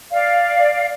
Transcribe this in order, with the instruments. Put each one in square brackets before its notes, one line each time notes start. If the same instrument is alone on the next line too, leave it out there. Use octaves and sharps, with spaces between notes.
[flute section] D5 F5